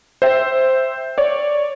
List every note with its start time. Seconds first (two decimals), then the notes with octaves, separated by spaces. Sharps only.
0.22 C5 E5 G5
1.18 C#5 D5